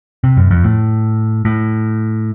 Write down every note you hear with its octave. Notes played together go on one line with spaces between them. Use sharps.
C3
F#2
F2
A2
A2